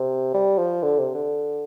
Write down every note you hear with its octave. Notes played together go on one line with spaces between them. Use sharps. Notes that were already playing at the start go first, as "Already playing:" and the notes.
Already playing: C3
G3
F3
D3
C3
D3